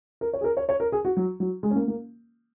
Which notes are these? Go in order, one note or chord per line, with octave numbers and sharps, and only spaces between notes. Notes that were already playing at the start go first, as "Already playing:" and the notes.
A#4
C#5
G#4
A#4
C#5
C#5
A#4
G#4
F#4
F#3
F#3
G#3
C#4
A#3
A#3